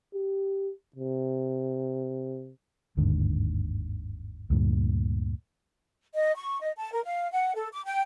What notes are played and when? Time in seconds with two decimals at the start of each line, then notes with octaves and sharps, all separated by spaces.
0.14 G4
0.96 C3
2.97 G1 D#2 G#2 D3
4.50 D2 G2 A#2
6.14 D#5
6.35 C#6
6.62 D#5
6.76 A5
6.92 A#4
7.04 F5
7.32 F#5
7.54 A4
7.71 D6
7.86 G5